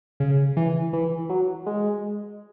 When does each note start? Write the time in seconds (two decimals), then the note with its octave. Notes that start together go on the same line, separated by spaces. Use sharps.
0.20 C#3
0.57 E3
0.93 E3
1.29 F#3
1.66 G#3